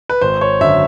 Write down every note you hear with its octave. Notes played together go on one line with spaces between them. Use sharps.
B4
G#1 C5
C#5
F#2 D3 E5